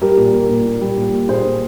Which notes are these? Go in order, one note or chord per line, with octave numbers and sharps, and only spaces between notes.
G3 G4 A#4
A#2
A#3
A#2
A#2
G3
A#2
A#3
A#2 G#4 C5
A#2